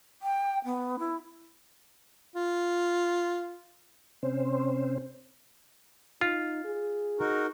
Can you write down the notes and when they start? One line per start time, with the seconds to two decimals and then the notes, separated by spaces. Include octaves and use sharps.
0.22 G5
0.65 B3
0.99 E4
2.35 F4
4.23 C3 C4 C#4 C5
6.21 D#4 F4
6.65 G#4
7.19 D#4 F#4 A#4